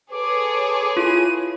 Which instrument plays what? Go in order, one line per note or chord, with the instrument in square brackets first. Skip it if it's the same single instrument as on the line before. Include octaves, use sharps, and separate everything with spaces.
[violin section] G#4 A4 C#5 [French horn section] B4 [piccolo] D6
[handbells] E4 F4 [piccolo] D#7